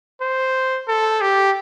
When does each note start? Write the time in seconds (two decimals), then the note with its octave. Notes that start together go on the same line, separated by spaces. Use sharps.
0.21 C5
0.88 A4
1.21 G4